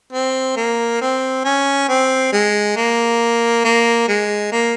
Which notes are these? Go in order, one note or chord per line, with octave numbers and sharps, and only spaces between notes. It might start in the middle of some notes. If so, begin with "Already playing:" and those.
C4
A#3
C4
C#4
C4
G#3
A#3
A#3
G#3
A#3